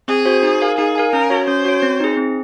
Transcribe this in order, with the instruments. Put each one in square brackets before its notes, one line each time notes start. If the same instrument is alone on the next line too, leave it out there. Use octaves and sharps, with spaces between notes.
[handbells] C4 [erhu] G#4
[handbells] F#4 C5
D#4
A#4 F5 G#5
[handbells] D#4 [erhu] G#4
[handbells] A#4 F5 G#5
[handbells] C#4 [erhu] A#4
[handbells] F#4 C#5
[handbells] C#4 [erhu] C5
[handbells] F#4 C#5
C4
D#4 G#4
C4